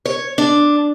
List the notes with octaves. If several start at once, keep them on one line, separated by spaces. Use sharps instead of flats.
C#5
D4